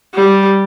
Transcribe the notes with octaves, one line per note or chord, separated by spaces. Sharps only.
G3